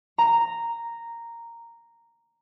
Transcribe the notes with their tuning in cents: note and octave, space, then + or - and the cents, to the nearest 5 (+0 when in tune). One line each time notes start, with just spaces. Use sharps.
A#5 -5